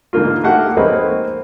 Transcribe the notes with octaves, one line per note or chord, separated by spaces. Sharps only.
G#2 D3 A#3 F4
A3 A#3 F#4 G4 F5 F#5
G#3 A#3 C4 D#4 B4 C#5